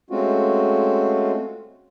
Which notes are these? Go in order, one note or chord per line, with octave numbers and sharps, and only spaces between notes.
G#3 A3 C4 C#4 F4 F#4